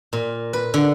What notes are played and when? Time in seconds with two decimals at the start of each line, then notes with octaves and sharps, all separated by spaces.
0.13 A#2
0.53 B4
0.74 D3